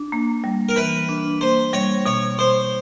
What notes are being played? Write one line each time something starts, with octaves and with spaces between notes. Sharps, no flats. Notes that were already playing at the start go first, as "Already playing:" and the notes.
Already playing: D4
A#3
G3
A#4
E3 B4
D4
A#3 C5
G3 C#5
B2 C#5
B2 C5